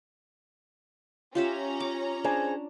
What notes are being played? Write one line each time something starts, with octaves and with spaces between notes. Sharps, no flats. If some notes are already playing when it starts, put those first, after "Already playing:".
C#4 F4 G4 E5 A#5
D6
D4 G#4 C5 G#5